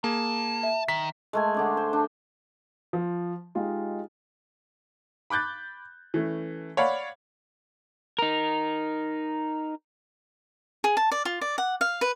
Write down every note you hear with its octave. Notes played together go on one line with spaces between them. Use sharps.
A#3 G#4 A5
E5
D#3 B6
G#3 A3 G#5
D3 D4 C6
C5
D4
F3
G#3 D#4 F4 G4
B5 D6 F#6 G6 A6
E3 A3 C#4
C#5 D5 F5 F#5 B5
D#4 A#4
G#4
A5
D5
F4
D5
F#5
F5
B4